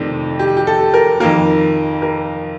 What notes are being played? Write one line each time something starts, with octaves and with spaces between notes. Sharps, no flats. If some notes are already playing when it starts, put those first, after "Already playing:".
Already playing: F2 C3 D#3 A3 C4 D4
G4
G4
A4
A#4
F2 D#3 A#3 A#4
A#4